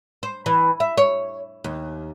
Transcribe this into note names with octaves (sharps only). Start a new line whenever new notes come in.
C5
E3
E5
C#5
D#2